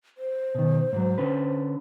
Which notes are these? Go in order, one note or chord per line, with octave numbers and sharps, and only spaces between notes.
C5
B2 D#3
G#2 F#3
D3 C#4 B4